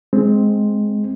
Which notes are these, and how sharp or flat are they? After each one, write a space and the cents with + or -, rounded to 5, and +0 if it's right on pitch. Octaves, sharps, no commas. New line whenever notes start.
G#3 +10 C4 +0